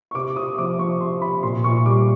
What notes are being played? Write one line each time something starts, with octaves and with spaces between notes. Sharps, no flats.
C#6
C3 D6
C3 D#6
F3 D6
F3 C#6
C3 C6
C3 B5
A#2 C6
A#2 C#6
G3 D6